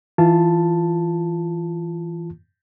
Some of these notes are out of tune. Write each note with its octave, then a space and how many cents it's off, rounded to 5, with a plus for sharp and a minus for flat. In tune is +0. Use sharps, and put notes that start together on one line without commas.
E3 +0 F4 -20 A5 +0